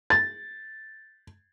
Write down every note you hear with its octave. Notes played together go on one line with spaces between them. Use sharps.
A6